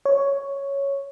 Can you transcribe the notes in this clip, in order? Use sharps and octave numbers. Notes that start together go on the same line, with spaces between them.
C#5